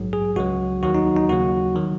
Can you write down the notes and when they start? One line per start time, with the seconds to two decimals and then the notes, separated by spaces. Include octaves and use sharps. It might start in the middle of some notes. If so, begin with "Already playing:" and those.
Already playing: A#1 G#2 F#3
0.13 G#4
0.36 C#2 C#3 F#3 F#4
0.83 D#2 D#3 F#3 F#4
0.95 D#4
1.17 D#4
1.29 D#2 C#3 F#3 F#4
1.76 D#3 F#3